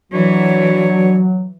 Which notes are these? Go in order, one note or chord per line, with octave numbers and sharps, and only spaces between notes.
E3 F#3 D4 F#4 C#5